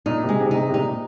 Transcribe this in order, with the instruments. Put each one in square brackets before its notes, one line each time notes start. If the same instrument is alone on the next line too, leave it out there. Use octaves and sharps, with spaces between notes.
[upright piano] A#2 [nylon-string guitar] D#4
[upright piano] C3
[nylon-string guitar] G#3
[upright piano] C3
[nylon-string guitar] D#4
[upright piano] C3
C3
[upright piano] A#2 [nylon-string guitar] D#4